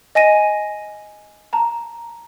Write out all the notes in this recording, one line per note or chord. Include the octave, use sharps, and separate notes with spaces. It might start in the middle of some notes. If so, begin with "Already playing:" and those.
D#5 G#5 A#6 D#7
A5 A#5